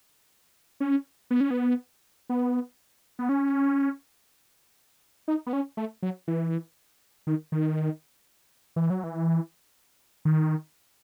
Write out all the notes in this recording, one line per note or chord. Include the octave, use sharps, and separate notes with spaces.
C#4
B3
C#4
B3
B3
B3
C#4
D#4
B3
C#4
A3
F#3
E3
D#3
D#3
E3
F#3
E3
D#3